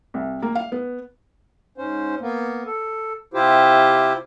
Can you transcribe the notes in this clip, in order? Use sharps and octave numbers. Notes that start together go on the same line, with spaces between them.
C2
A#3
F5
B3
G#2 C#4 C5
A#3 B3
A4
C3 E4 F4 G4 C5